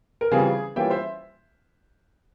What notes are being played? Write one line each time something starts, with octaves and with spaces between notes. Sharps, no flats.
A#4
C#3 E3 G3 C4 F4 G#4
E3 G3 A#3 C#4 F4 E5 G5
C5 E5